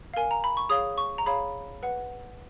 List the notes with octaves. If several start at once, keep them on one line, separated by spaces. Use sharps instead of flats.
A#4 F5 G#5
A#5
B5
C#6
G#4 C#5 F5 D#6
C#6
A#5
G#4 C#5 F5 B5
B4 F#5